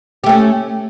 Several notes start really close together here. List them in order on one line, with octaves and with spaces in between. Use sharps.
G4 A3 C#4